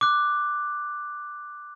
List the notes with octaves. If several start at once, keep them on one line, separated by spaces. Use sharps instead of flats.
D6 F#6